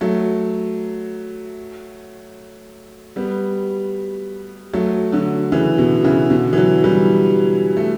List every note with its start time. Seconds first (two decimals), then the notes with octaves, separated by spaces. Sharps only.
0.01 F#3 A3
3.16 G3 B3
4.73 F#3 A3
5.12 D3 F#3
5.52 C#3 E3
5.78 B2 D3
6.04 C#3 E3
6.30 B2 D3
6.53 E3
6.57 D3 F#3
6.84 E3 G3
7.77 A3